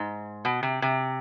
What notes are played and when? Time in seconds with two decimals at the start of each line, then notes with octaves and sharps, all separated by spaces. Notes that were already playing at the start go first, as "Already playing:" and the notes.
Already playing: G#2
0.45 B2
0.63 C3
0.82 C3